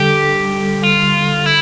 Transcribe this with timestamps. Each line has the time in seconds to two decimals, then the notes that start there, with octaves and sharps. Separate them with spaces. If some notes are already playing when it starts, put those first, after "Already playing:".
Already playing: D3 G3 G4 A4
0.83 F4
1.46 E4